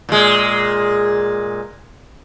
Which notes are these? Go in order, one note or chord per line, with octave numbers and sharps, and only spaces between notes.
A#2 G#3